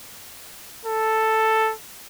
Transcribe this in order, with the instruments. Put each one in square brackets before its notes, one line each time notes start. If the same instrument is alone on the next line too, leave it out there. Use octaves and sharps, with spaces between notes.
[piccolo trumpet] A4